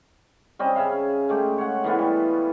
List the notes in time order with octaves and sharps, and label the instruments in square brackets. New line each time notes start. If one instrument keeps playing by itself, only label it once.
[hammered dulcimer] G3 C4 C#4 D#5
C#3 G#4 E5 F5
G#3 A3 G4
C#5 F#5
E3 A3 B3 F4
G3